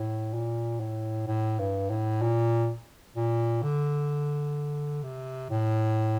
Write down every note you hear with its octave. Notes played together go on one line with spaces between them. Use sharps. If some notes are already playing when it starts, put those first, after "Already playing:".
Already playing: A2
A#2
A2
A2
G2
A2
A#2
A#2
D3
C3
A2